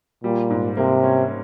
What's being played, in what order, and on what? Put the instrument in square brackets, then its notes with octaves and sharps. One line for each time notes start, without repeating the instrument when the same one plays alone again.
[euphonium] A#2 [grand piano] G3
[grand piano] G#2
[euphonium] C3 [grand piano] A#3
[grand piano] C#4